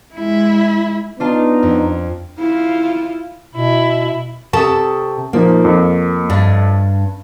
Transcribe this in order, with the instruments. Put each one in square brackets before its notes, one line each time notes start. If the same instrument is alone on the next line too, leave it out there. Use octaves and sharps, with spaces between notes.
[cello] G#3 E4
[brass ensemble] B3 D#4 [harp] D4 F4 A5
[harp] F2
[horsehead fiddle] E4 F4
[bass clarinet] B2 [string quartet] E4
[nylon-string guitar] C3 A4 A5 [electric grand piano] C#6 D#6
[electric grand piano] A#2 F3 D#4 [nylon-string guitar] A#3
[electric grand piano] F2
[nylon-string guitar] G2 D4